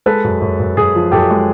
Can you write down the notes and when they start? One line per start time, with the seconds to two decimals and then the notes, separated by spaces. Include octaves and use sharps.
0.06 G#3 A4 B4
0.24 F#2
0.41 F#2
0.60 F#2
0.77 F#2 G#4
0.95 F3
1.12 F#2 G4 A4
1.30 G#3